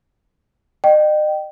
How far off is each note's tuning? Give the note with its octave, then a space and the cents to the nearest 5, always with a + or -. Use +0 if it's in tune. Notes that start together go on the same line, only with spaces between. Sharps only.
D#5 -40 G5 -20